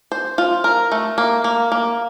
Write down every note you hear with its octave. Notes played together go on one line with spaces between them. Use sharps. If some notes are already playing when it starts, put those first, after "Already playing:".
C5
F4
A#4
A3
A#3
A#3
A#3